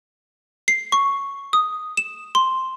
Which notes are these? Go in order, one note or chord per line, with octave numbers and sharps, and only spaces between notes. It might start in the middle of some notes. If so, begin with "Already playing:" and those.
C7
C#6
D#6
E7
C6